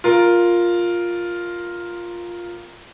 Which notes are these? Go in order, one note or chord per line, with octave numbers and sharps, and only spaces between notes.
F4 A#4